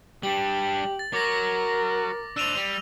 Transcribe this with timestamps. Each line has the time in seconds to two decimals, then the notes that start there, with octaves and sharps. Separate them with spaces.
0.23 G3 D4 G4 F#7
0.99 A6
1.13 F#4 A#4 C#5 D6 A#6
2.37 D4 C5 E6 D#7 F7
2.56 G3